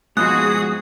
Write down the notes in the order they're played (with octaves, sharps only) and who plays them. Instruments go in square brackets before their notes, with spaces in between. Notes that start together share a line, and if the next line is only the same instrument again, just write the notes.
[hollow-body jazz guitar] G#2 B2 F3 [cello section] F#4 G#4 [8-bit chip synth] D#6 [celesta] F#6